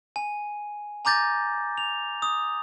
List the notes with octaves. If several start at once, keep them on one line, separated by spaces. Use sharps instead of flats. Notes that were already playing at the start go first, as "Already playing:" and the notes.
G#5
G#5 A#5 D6 G6 A6 A#6
F7
D#6